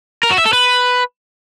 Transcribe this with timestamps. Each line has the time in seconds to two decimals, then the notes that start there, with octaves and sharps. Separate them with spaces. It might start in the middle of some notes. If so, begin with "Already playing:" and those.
0.23 A#4
0.31 F#4
0.38 E5
0.46 A4
0.53 B4